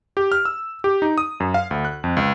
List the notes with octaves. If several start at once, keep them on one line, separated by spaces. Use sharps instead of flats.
G4
F6
E6
G4
D#4
D#6
F#2
F5
D2
F#6
F2
C#2